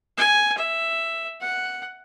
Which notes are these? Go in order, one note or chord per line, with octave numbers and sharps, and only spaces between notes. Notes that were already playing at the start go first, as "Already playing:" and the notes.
G#5
E5
F#5